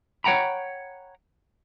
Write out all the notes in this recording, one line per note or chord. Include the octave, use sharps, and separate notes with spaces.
C#5 F#5 G5 A#5 B5